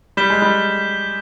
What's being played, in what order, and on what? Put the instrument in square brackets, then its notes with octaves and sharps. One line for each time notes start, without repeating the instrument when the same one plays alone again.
[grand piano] G3 [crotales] G6 B6 E7 G7
[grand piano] G#3
G3